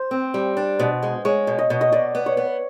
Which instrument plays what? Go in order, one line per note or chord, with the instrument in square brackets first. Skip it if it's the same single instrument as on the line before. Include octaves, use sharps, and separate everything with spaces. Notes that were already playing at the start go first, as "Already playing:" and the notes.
Already playing: [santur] C5
[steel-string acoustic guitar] C4
G3
D4
B2
G#3
[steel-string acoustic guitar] G#3 [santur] C#5
[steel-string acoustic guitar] B2
[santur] D#5
[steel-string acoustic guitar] B2
[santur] D#5
[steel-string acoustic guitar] B2 [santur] D5
[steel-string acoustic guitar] B3
[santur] C#5
[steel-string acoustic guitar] B3